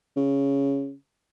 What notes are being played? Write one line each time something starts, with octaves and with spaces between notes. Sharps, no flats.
C#3